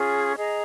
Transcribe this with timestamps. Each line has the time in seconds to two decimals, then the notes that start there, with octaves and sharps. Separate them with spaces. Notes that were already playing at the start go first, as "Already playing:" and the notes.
Already playing: C#4 F4 G#4
0.37 G#4 D#5 A#5